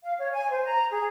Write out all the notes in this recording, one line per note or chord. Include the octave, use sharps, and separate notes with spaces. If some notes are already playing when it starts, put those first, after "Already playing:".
F5
C#5
G#5
C5
A#5
G#4